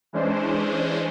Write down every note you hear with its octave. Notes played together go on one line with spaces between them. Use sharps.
E3 G#3 C#4 D4 C5